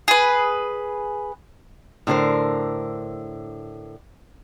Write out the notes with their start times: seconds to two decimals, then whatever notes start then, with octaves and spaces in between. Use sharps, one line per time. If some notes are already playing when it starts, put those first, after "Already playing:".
0.08 G#4 B4
2.07 A2 D3 A#4 C5